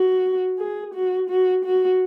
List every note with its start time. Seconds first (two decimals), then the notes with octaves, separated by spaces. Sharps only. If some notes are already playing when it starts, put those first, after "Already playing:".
Already playing: F#4
0.59 G#4
0.94 F#4
1.30 F#4
1.64 F#4